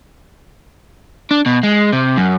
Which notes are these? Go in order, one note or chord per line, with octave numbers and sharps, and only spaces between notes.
D4
B2
G#3
C3
F#2